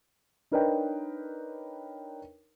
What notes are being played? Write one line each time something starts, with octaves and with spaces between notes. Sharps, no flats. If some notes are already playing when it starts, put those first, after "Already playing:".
D4 D#4 A#4 B4 C#5 G5